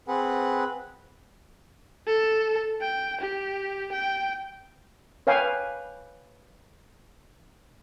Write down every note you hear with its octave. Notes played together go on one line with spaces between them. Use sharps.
C4 G#4 B4 F#5
A4
G5
G4
G5
B4 C#5 F5 G5 G#5